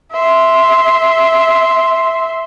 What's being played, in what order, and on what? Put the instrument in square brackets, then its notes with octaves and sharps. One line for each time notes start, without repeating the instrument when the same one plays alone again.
[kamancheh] E5 C6